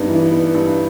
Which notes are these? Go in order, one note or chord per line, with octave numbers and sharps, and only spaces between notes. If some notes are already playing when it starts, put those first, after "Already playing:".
Already playing: G2 B3 D#4
E3
B3
G2